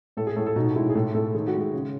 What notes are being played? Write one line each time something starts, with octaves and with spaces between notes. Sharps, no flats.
A2 A4
G#4
A2 A4
A4
B2 D#4
G#3 E4
G#4
A2 A4
A2 A4
D#3 G#4
F#4
G#3
G#4
C#3